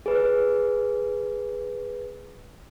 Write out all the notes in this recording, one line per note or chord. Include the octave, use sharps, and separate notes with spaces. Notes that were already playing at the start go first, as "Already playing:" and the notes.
G#4 B4